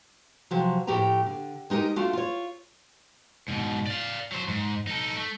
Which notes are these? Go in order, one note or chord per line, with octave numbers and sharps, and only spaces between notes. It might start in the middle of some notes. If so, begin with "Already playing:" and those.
C3 F3 F#3
A2 F3 A3 G4 G5 A#5
D3
G#3 D#4 G4 A#4
A3 D4 F4 F#4
F4 C#5
G#2 B2
D5 F5
F#3 C5
G#2
D#4 A4
A3